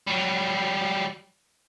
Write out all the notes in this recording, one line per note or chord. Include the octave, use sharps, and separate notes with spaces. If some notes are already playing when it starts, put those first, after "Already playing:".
F#3 G3